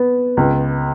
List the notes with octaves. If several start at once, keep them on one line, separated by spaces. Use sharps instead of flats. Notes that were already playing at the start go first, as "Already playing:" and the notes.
Already playing: B3
C#2